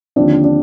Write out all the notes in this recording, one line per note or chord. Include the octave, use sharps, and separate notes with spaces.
D#2 D3 F3 C4 D4
D4